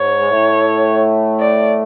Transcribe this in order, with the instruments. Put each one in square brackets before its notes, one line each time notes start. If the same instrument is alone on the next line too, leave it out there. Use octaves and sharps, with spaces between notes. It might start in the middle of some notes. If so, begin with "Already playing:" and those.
Already playing: [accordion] G#2 [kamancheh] C#5
[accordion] G#3
A2 A3
[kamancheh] D5